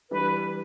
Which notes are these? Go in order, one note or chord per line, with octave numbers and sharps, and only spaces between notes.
E3 G3 D4 B4